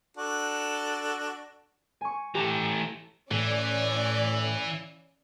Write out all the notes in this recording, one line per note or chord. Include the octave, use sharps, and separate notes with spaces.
D4 F#4 A4
G#5 C#6
E3 A3 G4 A#5
A2 E3 C#4 D5